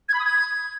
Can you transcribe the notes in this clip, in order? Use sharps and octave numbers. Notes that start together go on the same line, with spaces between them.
G#6
B5
D#6
G#6